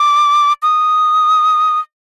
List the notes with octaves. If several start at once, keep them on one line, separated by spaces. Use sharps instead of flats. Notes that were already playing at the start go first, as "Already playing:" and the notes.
Already playing: D6
D#6